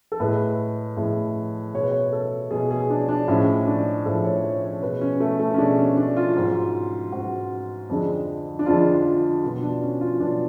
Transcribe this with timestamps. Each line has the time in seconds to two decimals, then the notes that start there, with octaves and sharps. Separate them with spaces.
0.12 A4
0.20 A2 G#3 B4
0.97 A2 G#3
1.74 B2 G#3 C#5
1.83 B4
1.91 C#5
2.12 A4
2.51 B2 G#3 G#4
2.71 G#4
2.90 D4
3.09 D4
3.28 A2 F3 G#3 C#4
3.67 D4
4.06 A2 F3 G#3 A4
4.24 C#5
4.44 C#5
4.63 C#5
4.82 B2 G#3 B4
5.01 C#4
5.20 A3
5.39 A3
5.54 C#4
5.58 B2 G#3 D4
5.78 C#4
5.97 D4
6.17 F4
6.36 G#2 F#3
7.12 G#2 F#3 F#4
7.90 F2 D3 G#3
8.59 D4
8.66 F2 D3 G#3 F4
9.06 F4
9.43 B2 F#3 F4
9.62 D4
9.82 C#4
10.01 F4
10.20 B2 F#3 D4